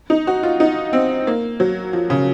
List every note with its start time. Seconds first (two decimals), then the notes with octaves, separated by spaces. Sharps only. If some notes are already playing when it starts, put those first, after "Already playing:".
0.10 D#4
0.27 F#4
0.43 F4
0.60 D#4
0.93 C4
1.27 A#3
1.60 F#3
1.93 F3
2.10 C#3